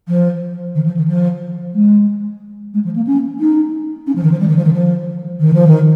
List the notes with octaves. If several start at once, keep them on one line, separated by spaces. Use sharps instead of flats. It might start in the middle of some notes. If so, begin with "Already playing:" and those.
F3
D#3
F3
D#3
F3
G#3
G#3
F3
A#3
C#4
D#4
C#4
F3
D#3
F3
G3
D#3
F3
D#3
F3
D#3
F3
D#3